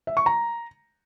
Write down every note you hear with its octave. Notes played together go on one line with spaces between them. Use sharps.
E5
C#6
A#5